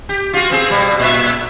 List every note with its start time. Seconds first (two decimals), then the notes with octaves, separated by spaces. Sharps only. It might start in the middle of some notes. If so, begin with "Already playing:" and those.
0.09 G4
0.34 F4 F#4
0.50 B3 C4 G#4
0.70 B2 G3
1.00 A#2 D#5 E5